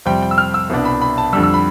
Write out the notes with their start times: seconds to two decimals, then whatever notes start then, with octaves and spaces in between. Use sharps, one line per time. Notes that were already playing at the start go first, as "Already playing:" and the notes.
0.05 F2 C3 G3 C4 G5
0.22 G5
0.31 E6
0.38 F6
0.54 E6
0.70 C2 B2 B3 D4
0.85 B5
1.01 B5
1.18 A5
1.33 F2 D3 G3 E6
1.43 E6
1.54 B5